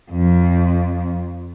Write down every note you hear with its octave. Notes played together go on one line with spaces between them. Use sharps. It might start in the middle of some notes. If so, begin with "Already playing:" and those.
F2